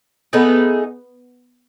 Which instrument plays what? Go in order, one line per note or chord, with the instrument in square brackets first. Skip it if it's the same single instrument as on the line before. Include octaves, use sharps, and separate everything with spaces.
[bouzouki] A3 D#4 G#4 [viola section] B3